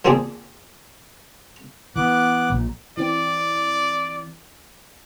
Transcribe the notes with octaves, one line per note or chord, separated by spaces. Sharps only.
F3 A#3 C4 G#4 D5
E3 B3 D6 F#6
A#1 A#2
E3 C4 D5